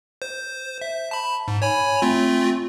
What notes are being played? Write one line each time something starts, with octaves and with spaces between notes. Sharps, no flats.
C5
E5
A5 B5
G#2
C#5 G#5 B5
A3 C4 F4